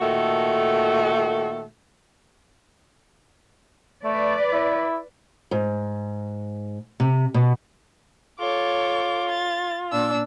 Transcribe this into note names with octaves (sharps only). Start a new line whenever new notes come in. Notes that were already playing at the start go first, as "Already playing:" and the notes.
A#2 D#3 A3 F#4 A4
A3 B4 D5
E4
G#2
C3
B2
F4 A4 C#5 D6
A6
A#2 D4 E6